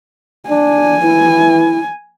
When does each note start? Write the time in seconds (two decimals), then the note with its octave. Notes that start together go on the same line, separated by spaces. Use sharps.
0.50 D4 G#5
1.02 E3 E4